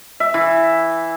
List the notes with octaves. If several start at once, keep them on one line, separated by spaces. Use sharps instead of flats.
E5
E3